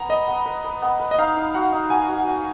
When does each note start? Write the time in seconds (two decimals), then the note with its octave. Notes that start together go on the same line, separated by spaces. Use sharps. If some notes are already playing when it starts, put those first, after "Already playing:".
Already playing: B3 A#5
0.09 B4 D#5
0.27 B3
0.46 B4
0.64 B4
0.82 B3
0.99 B4
1.11 D#5
1.18 D#4 F5
1.36 D#4
1.54 F#4 F#5
1.72 D#4
1.90 F#4 G#5
2.09 F#4
2.27 F#4